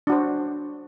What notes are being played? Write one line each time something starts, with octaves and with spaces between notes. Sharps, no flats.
D4 F#4 C5